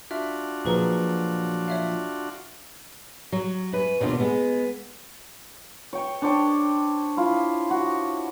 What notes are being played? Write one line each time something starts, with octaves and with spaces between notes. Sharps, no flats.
D4 F4 F#4 E5
A#2 F3 F#3 G#4 B4 A#5
C#5 E5 F5
F#3
F#2 B4
D#2 B2 D3 D4 F4
G#3 B3
C#5 G5 C#6
D4 C5 C#5 G5
E4 F4
F#4